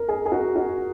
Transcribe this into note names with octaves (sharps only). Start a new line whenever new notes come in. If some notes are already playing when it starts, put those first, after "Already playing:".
Already playing: A#4
G#4
G#4
F#4
F#4